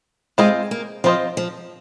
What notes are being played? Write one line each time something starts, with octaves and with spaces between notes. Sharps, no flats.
G#3 C4 F4 C5 D#5
A#3
F3 C4 F4 C5 D#5
F3